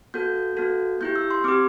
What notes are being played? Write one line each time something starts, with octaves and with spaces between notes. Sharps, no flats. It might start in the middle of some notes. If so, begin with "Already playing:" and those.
B3 F#4 A4 G6
B3 F#4 A4
B3 E4 G4 G6
E6
C6
C4 G4 D6